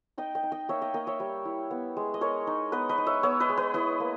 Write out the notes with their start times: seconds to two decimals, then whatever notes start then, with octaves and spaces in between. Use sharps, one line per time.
0.18 D#4 D#5 G5
0.35 D#5 G5
0.43 D#4
0.52 D#5 G5
0.69 A#3 C#5 E5
0.81 D#5 G5
0.94 A#3 D#5 G5
1.07 C#5 E5
1.20 G3
1.45 E4
1.71 B3
1.97 G#3
2.14 D#5
2.21 G#3 A#4 C#5
2.47 D#4
2.72 B3 B4 D#5
2.89 B4 D#5
2.98 D#4
3.06 C#5 E5
3.23 B3 C#5 E5
3.40 B4 D#5
3.49 G#3
3.57 B4 D#5
3.74 E4 B4 D#5
4.00 A#3